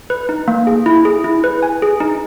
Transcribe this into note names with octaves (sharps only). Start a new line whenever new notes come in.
B4
D#4
A#3
G#4
E4
G#4
E4
B4
G#5
G#4
D#4